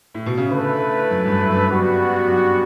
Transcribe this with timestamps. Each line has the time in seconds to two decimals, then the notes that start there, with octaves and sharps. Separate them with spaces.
0.14 A2
0.26 B2
0.37 C#3
0.50 D3 A3 E4 B4
1.11 F#2
1.26 G2
1.41 F#2
1.56 G2
1.71 F#2 G3 B3 F#4
2.27 F#2
2.32 G2